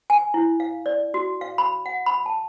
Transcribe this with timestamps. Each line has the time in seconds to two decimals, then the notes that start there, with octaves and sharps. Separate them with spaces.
0.10 G#5
0.34 E4
0.60 F5
0.86 D5
1.14 F#4
1.41 F5
1.58 B5
1.86 F#5
2.06 B5
2.26 A5